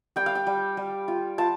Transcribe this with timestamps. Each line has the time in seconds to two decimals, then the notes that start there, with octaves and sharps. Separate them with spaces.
0.16 G3 G5
0.26 F5
0.35 G5
0.47 G3
0.77 G3
1.08 F4
1.38 F4 A5